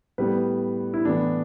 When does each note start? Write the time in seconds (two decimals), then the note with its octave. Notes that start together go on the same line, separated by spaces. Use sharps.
0.18 A2 G3 B3 B4
0.94 E4
1.05 A2 E3 B3 D4